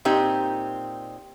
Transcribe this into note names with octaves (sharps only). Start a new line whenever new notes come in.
A#2 C4 D#4 G4